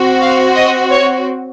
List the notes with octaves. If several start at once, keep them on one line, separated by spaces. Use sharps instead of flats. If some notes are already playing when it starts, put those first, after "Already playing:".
Already playing: C4 F#4
F5
D#5
C#5